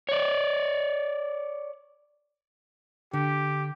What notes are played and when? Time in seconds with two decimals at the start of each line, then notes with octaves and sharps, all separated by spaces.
0.09 C#5 D5
3.13 D3 G4